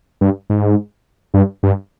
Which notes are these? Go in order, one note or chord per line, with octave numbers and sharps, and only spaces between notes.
G2
G#2
G2
G2